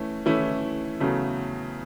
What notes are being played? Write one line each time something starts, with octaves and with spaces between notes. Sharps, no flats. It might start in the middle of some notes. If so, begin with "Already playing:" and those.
Already playing: E3 A3 C#4
E3 A3 C#4 E4
E2 C#3 F#3 A3